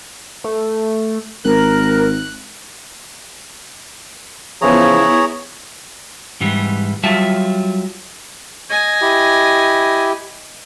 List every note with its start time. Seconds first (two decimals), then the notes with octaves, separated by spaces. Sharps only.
0.44 A3
1.44 G#1 A#4 F#6
4.62 C#3 E3 F3 B3 E4 G#4 C#5 A#5
6.41 G#2 E3 G3
7.03 F#3 G3 F4 E5 A5
8.70 D#5 G#5
9.02 E4 G4